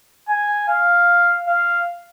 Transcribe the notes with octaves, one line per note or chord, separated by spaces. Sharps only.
G#5
F5
F5